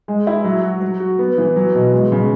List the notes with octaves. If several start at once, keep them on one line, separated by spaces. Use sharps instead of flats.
G#3
E4
F#3
F#4
F#3
F#4
B3
E3
F#3
B2
G#3
C#3